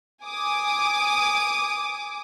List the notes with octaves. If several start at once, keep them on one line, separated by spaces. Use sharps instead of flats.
G#5 D6 D#6